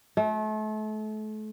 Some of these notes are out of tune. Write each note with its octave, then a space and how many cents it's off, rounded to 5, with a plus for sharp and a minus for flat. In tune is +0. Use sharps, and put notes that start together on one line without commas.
A3 -35